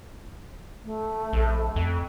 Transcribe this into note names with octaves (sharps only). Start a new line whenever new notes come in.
A3
A#1
F2